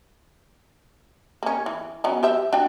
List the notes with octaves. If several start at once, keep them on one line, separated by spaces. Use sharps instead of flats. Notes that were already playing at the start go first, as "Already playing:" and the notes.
A#3 C#4
E3
F#3 B3 C#4
G4 C5 E5
D4 F#4 G5